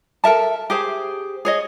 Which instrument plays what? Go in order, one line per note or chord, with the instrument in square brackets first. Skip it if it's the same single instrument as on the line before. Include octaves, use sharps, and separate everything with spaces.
[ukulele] A4 A#4 E5 A5
G4 G#4 C5
G#4 C#5 D#5